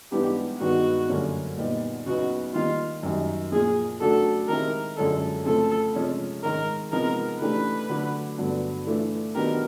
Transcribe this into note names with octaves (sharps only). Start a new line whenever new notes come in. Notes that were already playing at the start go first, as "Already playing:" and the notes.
G#2 E3 G3 B3 D4 G4
G2 D#3 G#3 B3 D#4 F#4
F#2 D3 G3 A#3 C#4
A#2 G3 B3 D#4 G4
E2 C#3 F#3 B3 D#4 F#4
D#3 G3 A#3 D#4 F4
F#2 D#3 G3
A#2 F3 A#3 G#4
C#3 F#3 A3 D4 F#4 A4
D#3 G#3 C4 E4 G4 A#4
F#2 D3 F3 G#3 C#4 A4
C#3 F3 A3 C4 A4
C3 F3 G#3 C#4
G#2 D#3 G#3 A#4
C3 F3 G#3 B3 D#4 A#4
C#3 E3 A3 D4 G4 B4
D3 F#3 A3 D4 F#4
G2 D3 F#3 B3 D4
E3 A3 D4 F4
D#3 F#3 B3 D4 G4 A#4